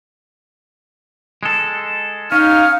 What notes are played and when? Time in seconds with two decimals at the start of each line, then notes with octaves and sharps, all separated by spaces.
1.43 G#3 A4
2.32 C#4 D#4 F5 F6